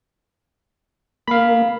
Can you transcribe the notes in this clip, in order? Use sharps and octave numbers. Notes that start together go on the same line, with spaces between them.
A#3 F5 B5